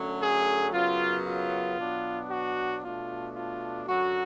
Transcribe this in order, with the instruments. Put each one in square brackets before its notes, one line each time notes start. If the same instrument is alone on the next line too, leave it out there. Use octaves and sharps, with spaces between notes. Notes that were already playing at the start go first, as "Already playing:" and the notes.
Already playing: [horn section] F#2 D3 F#3 A3 C#4
G#4
F#2 C#3 F#3 B3 F4
F4
B2 F#3 B3 D4
F#4
B2 A3 D4 F4
F4
F#2 D3 F#3 F#4